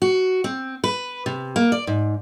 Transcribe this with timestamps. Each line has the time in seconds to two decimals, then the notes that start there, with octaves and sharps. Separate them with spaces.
0.02 F#4
0.44 C4
0.84 B4
1.26 C3
1.56 A#3
1.72 D5
1.87 G#2